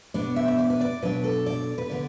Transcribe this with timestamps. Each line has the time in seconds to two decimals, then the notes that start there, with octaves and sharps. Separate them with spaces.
0.14 B2 B3 D4 D5
0.36 E5
0.48 E5
0.59 D5
0.70 B4
0.80 D5
1.02 B2 F#3 D4 B4
1.24 A4
1.46 D5
1.78 B4
1.90 D3 B3 D5